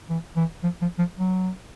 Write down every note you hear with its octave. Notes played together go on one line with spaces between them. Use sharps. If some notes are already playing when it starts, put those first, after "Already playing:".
E3
E3
F3
F3
F3
F#3